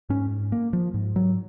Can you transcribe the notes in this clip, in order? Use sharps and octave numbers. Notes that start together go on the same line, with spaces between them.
G#2 C#4
A#3
F3
G#2
F#3